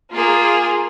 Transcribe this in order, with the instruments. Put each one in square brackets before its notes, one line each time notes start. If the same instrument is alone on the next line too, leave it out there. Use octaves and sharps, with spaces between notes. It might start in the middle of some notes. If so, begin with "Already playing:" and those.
[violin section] A#3 F4 G#4